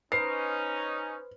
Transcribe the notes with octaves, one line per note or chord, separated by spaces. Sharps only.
C#4 D#4 B4 C5 C7